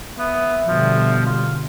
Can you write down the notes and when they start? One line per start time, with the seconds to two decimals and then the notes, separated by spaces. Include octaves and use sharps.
0.19 B3 E5
0.67 B2 D3 F3 G3
1.26 F4